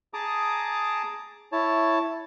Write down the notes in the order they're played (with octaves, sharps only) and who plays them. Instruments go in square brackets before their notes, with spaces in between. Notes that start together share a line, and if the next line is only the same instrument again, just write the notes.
[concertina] G#4 A5 A#5 D6 D#6
E4 C#5 A5